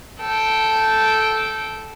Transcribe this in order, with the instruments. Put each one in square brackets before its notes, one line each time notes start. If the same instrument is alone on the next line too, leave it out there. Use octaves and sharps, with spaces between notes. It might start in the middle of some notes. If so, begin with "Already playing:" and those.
[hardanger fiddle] A4 G5